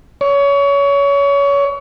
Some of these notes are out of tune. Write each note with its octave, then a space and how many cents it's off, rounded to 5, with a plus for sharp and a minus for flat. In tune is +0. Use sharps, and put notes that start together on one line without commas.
C#5 +25